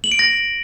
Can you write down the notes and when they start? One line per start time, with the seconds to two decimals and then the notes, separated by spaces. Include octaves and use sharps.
0.04 F#7
0.12 D7
0.19 A#6